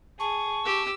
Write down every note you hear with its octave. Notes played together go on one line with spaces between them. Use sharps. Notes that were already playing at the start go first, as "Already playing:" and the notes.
G#4 A5 C#6
G4 E6